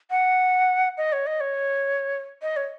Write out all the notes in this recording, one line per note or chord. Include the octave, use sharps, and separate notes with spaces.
F#5
D#5
C#5
D#5
C#5
D#5
C#5